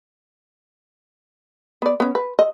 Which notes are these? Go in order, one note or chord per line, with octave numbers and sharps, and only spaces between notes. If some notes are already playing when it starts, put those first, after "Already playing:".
B3 D5
B3 C#4
B4
D#5